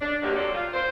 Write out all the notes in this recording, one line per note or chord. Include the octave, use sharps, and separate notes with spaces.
D4
G2 D3 D#3 F#3 A#3 G4
F#3 C4 G4 A4 C5 D5
F4
C5